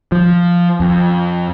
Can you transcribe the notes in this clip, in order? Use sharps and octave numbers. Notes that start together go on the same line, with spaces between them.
F3
F2